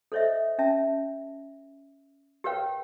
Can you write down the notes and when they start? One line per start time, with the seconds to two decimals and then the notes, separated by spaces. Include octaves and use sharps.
0.12 A4 C5 C#5 D#5 E5
0.58 C#4 E5 A5
2.44 G4 A#4 B4 C#5 F5 G5